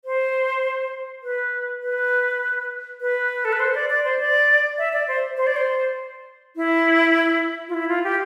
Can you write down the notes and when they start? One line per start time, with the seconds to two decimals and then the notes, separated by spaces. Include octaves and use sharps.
0.05 C5
1.23 B4
1.82 B4
3.01 B4
3.45 A4
3.53 B4
3.60 C5
3.75 D5
3.90 D5
4.04 C5
4.19 D5
4.78 E5
4.93 D5
5.08 C5
5.37 C5
5.47 D5
5.56 C5
6.56 E4
7.69 F4
7.74 E4
7.89 F4
8.04 G4